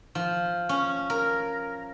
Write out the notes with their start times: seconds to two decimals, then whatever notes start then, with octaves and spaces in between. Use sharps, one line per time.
0.15 F3
0.69 C#4
1.10 A#4